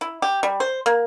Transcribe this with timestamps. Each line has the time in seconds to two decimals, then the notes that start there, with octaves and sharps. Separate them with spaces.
0.01 E4
0.22 G4
0.43 G3
0.60 C5
0.86 A#3